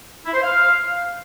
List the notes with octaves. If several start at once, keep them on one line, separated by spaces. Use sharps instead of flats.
E4
C5
F5